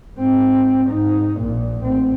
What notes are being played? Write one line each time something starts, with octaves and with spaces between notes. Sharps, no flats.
G#2 C4
G#2 D#4
A#1 A#2
A1 C4